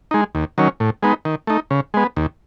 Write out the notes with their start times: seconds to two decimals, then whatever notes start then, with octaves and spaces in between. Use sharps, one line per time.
0.11 G#3 D#4
0.35 D#2
0.58 D#3 F#3 C#4
0.80 A2
1.03 G#3 B3 D#4
1.25 D#3
1.47 A3 D#4
1.71 C#3
1.94 G#3 B3
2.17 D#2